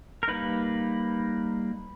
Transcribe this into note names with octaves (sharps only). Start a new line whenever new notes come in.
A#4
G3 A#3 D#4 B4